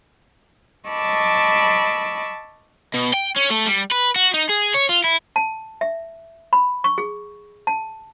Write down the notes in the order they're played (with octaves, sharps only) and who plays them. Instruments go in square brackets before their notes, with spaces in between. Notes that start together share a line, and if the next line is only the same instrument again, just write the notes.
[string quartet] D#5 A5 B5 C#6 D6 E6
[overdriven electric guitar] B2
G5
C#4
A3
G3
B4
F#4
D#4
G#4
C#5
F4
E4
[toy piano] A5
E5
B5
C#6
G#4
A5